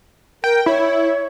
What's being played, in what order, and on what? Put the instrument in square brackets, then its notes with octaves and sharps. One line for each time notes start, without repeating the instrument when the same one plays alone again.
[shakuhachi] A#4 [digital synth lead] G5
[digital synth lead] E4 [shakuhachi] C#5